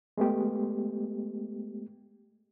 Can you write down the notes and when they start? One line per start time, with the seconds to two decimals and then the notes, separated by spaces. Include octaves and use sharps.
0.18 G#3 A3 B3 G4